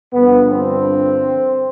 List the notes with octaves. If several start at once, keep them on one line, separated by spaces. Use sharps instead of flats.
G2 D3 F3 B3
C4